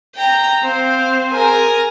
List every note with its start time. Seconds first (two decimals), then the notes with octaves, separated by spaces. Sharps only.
0.16 G5 A#5
0.63 C4 C5 F5
1.33 G#4 A#4 G#5 A#6